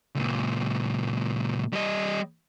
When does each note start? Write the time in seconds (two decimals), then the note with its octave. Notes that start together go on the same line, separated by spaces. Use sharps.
0.15 C#2 A#2
1.73 G3 D#5